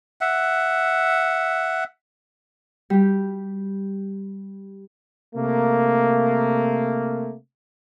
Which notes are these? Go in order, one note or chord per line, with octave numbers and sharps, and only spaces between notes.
E5 F#5
G3 G4
C3 A3 A#3